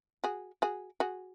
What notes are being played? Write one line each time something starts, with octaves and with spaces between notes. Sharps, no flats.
F#4 G#4
F#4 G#4
F#4 G#4